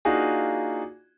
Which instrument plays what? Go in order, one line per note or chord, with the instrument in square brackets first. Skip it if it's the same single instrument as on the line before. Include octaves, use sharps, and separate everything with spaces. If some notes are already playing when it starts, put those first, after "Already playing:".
[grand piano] A#3 D4 D#4 F4 F#4 G#4